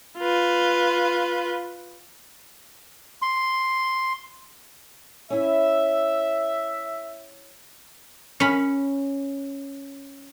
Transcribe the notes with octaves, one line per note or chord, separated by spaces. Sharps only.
F4 B4
C6
C#4 E4 E5
C#4 B5